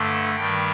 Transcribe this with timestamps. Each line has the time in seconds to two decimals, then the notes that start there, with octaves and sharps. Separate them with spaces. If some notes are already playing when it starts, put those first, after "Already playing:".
Already playing: G2 D3 A3 A4
0.35 G2 D#3 G3 G5